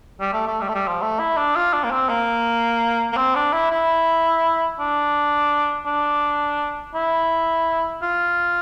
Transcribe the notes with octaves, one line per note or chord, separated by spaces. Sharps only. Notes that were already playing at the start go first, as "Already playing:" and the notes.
G3
A3
A3
G3
A3
G3
F3
A3
E4
D4
F4
D4
A#3
C4
A#3
A#3
C4
D4
E4
E4
D4
D4
E4
F4